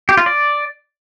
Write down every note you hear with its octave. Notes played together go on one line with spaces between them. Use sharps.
G4
F4
D5